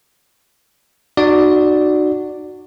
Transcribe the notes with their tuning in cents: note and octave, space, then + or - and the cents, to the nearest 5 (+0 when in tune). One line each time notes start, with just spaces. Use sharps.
D#4 -40 F#4 +0 D5 +0